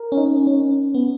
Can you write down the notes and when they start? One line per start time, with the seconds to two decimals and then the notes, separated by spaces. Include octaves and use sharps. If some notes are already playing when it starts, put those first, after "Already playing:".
Already playing: A#4
0.12 C#4
0.17 D#4
0.47 C#4
0.94 B3